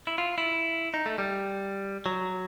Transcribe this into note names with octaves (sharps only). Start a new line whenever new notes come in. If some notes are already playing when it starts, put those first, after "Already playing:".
E4
F4
E4
D#4
A3
G3
F#3